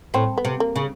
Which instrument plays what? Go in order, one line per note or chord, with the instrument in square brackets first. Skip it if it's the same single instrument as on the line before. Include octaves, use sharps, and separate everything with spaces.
[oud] A2 [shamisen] C4
[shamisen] B3
[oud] C3
[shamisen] A#3
[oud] C#3